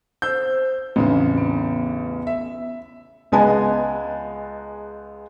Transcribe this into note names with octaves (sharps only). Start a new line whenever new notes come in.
C5 E6 G6
A1 E2 C#3 C4 D4
B3
E5
C#2 G#3 B3 D#5 G#5 A5